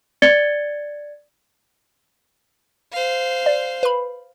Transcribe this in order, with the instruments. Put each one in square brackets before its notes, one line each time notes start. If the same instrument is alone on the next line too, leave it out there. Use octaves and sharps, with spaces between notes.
[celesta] D5 G#6 A6 C#7 G7
[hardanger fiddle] C5 F5
[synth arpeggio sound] D5
B4 B5